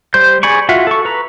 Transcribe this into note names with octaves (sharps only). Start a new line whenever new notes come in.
G3 C5 C6 G6
G#4 D5 G#5 B5 C#6
F4 F#4 E5 F#5
A4 C#6
B4 A#5